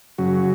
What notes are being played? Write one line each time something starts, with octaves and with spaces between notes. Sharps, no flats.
F#2 C#3 F#3 F#4